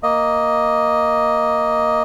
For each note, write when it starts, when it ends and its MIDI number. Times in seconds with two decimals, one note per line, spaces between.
0.03 2.03 58
0.03 2.03 75